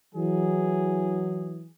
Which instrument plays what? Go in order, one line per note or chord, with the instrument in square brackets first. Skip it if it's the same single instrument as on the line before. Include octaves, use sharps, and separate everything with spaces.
[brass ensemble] E3 F#3 G#4